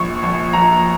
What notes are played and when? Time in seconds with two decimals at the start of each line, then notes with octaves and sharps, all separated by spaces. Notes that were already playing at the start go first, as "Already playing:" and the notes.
Already playing: A#1 C#6
0.23 A#1
0.53 A#1 A#5